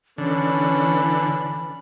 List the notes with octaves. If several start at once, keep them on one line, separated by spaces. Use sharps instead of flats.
D3 E3 C#4 B5